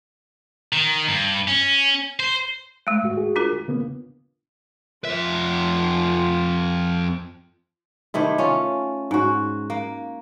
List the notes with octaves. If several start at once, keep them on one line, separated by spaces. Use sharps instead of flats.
D#3
G2
C#4
C5
G#3 A3
G#2 F#4
F#4 G#4
D4 F4 A#4
C#3 A#3 B3
F2 F4 E5
C3 D#3 A3 E4
C#4 F4
G#2 F#4
A#3